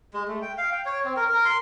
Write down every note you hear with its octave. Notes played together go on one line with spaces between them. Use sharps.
G#3
A3
G5
F5
G5
C#5
C4
A#4
A#4
C6